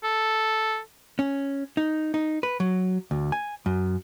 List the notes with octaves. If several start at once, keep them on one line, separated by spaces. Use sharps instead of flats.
A4
C#4
D#4
D#4
B4
F#3
D2
G#5
F#2